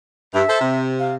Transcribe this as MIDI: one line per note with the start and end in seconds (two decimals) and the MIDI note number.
0.34 0.43 43
0.34 0.79 76
0.48 0.60 69
0.48 0.60 72
0.60 1.16 48
0.99 1.15 77